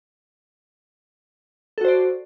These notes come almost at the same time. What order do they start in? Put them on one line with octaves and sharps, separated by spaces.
A4 F#4 C5 D5